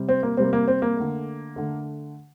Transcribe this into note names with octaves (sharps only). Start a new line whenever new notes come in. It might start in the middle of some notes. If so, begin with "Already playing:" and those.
Already playing: C3 G3
C4
A#3
C3 G3 A#3 C4
A#3
C4
A#3
D3 A3
D3 A3